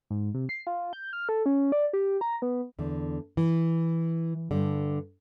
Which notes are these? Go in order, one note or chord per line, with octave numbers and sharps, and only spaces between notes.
G#2
C3
C7
F4
G6
F6
A4
C#4
D5
G4
A#5
B3
E2 D3
E3
G2 D3